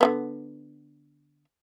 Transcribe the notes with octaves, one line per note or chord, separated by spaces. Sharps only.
D3 G#3 B3